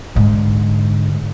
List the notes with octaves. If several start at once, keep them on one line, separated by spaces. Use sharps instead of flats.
G#2 D3